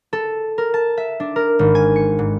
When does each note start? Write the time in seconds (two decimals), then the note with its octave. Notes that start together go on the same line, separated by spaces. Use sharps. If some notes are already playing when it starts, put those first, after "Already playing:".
0.13 A4
0.58 A#4
0.74 A5
0.97 E5
1.20 D4
1.36 A#4
1.59 G#1
1.75 G#5
1.96 C#7
2.19 G#2